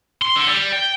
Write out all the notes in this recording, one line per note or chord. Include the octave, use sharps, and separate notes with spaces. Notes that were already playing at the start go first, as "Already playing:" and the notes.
C6
D3
G3
G5